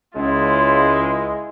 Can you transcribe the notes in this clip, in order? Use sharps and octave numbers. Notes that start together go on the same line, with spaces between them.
C#2 G#3 E4 F4